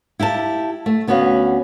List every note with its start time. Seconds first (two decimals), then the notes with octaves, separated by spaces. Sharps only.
0.20 E4 G4 F5 A5
0.86 A3
1.07 D2 B3 C#4 F#4 C#5 F5